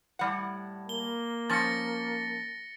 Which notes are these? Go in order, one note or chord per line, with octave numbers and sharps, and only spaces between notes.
A2 G3 F#5
A#3 G7
F3 C#4 A6 A#6 C#7